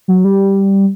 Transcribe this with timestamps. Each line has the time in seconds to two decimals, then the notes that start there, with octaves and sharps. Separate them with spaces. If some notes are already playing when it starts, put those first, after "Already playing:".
0.08 F#3
0.24 G3